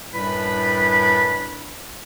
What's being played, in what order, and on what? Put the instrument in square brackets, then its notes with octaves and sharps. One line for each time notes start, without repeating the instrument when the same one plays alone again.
[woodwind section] F#2 A2 G3 D4 B4 B5